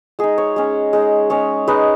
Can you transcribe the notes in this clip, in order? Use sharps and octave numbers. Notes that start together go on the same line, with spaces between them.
G#3 D#4 G#4
C#5
G#3 C#4
G#3 D#4
G#3 C#4 C#5
G#3 D#4 B4